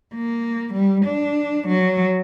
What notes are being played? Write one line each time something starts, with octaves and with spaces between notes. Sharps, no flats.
A#3
G3
D4
F#3